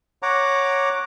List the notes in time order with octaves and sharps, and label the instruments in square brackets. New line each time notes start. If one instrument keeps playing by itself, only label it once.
[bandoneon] C#5 F#5 A#5 D6